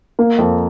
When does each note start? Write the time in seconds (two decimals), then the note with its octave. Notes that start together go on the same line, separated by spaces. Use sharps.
0.19 A#3
0.38 F2